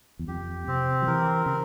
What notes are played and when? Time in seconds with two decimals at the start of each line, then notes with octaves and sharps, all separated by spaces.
0.19 E2
0.28 F2 G4
0.68 C3 C4
1.02 F3
1.07 E3 A#4
1.45 C#3 C4